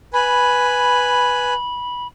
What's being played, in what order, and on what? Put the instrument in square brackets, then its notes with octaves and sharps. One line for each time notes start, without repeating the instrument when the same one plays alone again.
[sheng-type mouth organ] B4 G#5 [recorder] B5